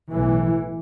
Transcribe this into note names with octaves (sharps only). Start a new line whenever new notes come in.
B1 A2 E3